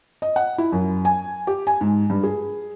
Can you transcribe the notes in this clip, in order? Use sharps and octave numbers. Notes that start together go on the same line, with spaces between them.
D#5
F#5
E4
F#2
G#5
G4
G#5
G#2
G2
G#4